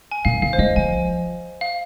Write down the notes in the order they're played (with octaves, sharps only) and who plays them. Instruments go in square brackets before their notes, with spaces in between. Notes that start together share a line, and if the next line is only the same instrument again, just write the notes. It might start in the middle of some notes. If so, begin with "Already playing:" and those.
[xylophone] G#5
[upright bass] A#2 [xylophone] F5
[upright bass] D#3 [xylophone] F5
[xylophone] C5
[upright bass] G#3 [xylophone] D#5
[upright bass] F3 [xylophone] G#5
[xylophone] F5